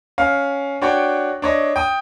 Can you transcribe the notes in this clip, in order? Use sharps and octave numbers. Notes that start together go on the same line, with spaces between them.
C#4 F5 F6
D4 F#4 C#5 G5
D4 C#5 D#5
G5 D#6